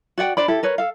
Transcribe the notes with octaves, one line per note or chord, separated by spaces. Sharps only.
F#4 D5 F#5 G5
D4 C5 D5 B5
E4 G4 A4
A#4 B4 C#5
A4 F5